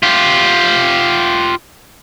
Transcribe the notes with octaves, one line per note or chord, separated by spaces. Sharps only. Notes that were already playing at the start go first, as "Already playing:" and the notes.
F4 G4